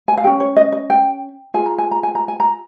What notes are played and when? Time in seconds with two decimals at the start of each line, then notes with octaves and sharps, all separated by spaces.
0.08 G#5
0.17 F5
0.24 G#4 G5
0.27 C#4
0.40 C#5
0.56 D#5
0.72 D#5
0.90 G5
1.54 F4 G#4 G#5
1.66 A#5
1.78 G#5
1.91 A#5
2.03 G#5
2.15 A#5
2.28 G#5
2.40 A#5